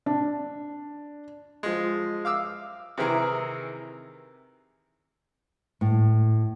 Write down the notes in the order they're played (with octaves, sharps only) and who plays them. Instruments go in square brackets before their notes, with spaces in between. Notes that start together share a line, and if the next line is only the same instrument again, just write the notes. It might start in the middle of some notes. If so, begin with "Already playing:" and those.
[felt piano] D4
[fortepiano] F3 G#3
F5 D6 E6
C3 D#3 E3 E4 G#4 A#4
[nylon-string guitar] A2